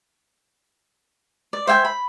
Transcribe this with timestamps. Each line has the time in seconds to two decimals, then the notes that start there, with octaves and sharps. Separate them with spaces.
1.53 D5
1.67 C5 E5 G5 G#5
1.85 B5